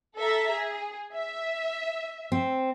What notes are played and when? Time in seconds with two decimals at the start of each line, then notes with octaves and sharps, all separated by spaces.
0.17 A4 E5 A#5
0.51 G#4
1.14 E5
2.32 C4